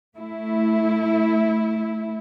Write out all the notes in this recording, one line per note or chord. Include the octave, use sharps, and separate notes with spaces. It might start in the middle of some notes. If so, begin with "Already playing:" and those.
A3 E4